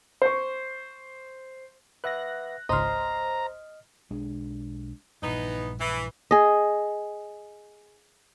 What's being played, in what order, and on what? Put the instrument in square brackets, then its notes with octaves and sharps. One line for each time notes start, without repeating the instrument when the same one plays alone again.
[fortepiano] C5 C#6
[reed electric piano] B4 E5 F#5 [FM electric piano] F#6 A#6
[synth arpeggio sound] G#1 C#2 [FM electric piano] C5 C6 [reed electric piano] D#5 F6 [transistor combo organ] A#5
[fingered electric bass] B1 G#3 D4
[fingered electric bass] A#1 G2 [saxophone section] E3 B3 D#4
[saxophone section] E3
[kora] G#4 D#5